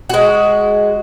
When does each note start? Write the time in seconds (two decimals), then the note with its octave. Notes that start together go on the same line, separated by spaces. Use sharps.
0.09 G#3 F#4